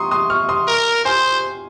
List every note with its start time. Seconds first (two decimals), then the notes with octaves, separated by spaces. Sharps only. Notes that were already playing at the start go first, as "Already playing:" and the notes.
Already playing: A#5 C6 C#6 D#6
0.11 C6 D#6
0.30 C#6 F6
0.49 C6 D#6
0.68 A#4
1.05 C5 G#5 C6